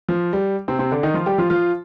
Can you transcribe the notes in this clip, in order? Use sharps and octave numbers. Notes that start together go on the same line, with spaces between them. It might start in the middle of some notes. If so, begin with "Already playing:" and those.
F3
G3
C3 C4
C3 C4
D3 D4
D#3 D#4
F3 F4
G3 G4
F3 F4
F3 F4